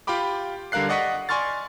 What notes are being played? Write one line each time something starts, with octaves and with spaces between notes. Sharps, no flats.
F4 G4 G5 B5 D6
D3 G3 A#4 F5 F#6 C7
D5 D#5 F#5 C#6 D#6 B6
D5 G#5 C6 C#6 F6 A6